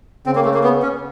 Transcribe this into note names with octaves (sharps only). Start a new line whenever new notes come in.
C#3 C4
A#3
A3
A#3
B3
C#4